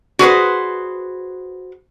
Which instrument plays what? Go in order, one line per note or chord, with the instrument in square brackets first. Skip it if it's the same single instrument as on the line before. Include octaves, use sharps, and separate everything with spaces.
[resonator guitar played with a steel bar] F#4 G#4 B4 C5